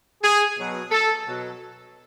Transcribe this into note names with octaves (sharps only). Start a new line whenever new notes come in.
G#4
B2 F#3
A4
B2 F#3